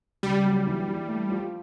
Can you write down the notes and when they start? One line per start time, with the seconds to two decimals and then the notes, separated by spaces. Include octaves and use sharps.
0.23 C#2 G3
0.45 F#3
0.67 E3
0.88 E3
1.08 A3
1.30 F3